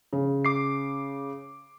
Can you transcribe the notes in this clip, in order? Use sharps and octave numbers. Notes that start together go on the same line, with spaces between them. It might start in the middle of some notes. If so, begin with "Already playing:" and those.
C#3
D6 C7